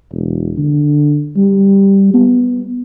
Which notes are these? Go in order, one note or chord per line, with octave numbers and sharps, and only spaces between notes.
E1
D3
G3
B3